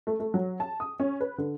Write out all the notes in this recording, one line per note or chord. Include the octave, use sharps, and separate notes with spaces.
A3
A3
F#3
A5
D#6
C#4
B4
D3